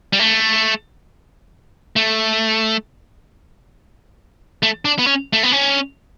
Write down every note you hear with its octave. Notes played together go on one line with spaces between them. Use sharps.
G3
A3
A3
A3
D4
B3
C#4
A3
B3
C#4